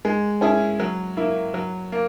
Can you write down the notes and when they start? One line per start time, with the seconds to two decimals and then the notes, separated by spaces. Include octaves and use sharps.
0.05 G#3
0.41 C#4 E4 G#4
0.80 F#3
1.17 A#3 E4
1.54 F#3
1.92 A#3